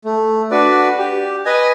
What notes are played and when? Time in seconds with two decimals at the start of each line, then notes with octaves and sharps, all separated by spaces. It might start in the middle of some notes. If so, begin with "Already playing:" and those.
0.04 A3
0.51 D4 F#4 B4 D5
0.98 G4
1.45 B4 D#5 G#5